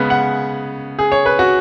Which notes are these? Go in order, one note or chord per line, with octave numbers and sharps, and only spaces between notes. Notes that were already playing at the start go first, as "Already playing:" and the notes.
Already playing: C#3 G#3 B3
F#5
G#4
C#5
B4
F#4